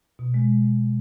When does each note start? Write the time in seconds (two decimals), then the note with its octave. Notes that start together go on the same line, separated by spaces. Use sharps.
0.19 B2
0.34 G#3